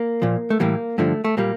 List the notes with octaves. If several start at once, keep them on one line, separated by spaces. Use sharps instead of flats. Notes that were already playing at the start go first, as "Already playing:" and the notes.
Already playing: A#3
A#2 F3
A3
A2 E3 G3 A#3
G2 D3 F3 A3
A3
A#2 G3 A#3